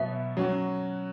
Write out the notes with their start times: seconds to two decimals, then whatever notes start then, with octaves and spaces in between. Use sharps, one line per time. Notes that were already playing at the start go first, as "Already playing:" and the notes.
Already playing: B2 F#3 B3 E5
0.37 F#3 C#4 F#4